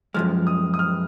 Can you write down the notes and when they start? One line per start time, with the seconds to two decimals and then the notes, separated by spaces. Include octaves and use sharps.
0.14 F#2 F3 G#3 F6
0.47 D#6
0.74 D#6
0.79 F6